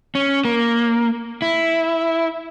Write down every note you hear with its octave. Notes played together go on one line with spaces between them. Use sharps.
C#4
A#3
E4